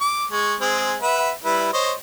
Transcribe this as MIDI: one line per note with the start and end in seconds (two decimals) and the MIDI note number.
0.01 0.24 86
0.31 0.55 56
0.31 0.55 85
0.61 0.96 56
0.61 0.96 60
0.61 0.96 68
1.02 1.31 71
1.02 1.31 76
1.02 1.31 78
1.44 1.71 55
1.44 1.71 64
1.44 1.71 71
1.73 1.93 72
1.73 1.93 73
1.73 1.93 75